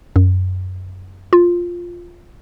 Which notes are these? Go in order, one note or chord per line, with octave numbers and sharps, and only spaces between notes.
F#2
F4